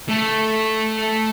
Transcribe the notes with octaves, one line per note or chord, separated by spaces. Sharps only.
A3 A4